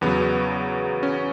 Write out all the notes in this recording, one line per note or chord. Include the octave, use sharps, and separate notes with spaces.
E2 C#3 F#3 B3
C#4